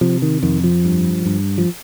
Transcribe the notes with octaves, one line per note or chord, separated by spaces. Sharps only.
C3 F3
D#3
F2 D#3
F3
G2
G2
F3